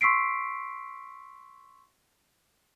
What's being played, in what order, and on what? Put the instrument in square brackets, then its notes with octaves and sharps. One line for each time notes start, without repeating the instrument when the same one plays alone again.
[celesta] C6 C#6 E6 B6 C7 D7